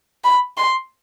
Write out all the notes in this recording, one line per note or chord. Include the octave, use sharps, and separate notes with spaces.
B5
C6